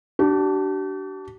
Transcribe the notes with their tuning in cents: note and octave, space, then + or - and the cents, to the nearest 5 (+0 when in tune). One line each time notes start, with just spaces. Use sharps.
D4 +0 G4 -45